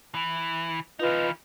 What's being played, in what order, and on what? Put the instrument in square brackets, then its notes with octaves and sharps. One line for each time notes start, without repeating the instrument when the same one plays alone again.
[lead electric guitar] E3
[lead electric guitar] E3 D#4 [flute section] F4 B4 D#5